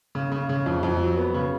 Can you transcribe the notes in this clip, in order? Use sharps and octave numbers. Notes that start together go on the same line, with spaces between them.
C#3
C#3
C#3
F2
F2
F#3
B3
C#3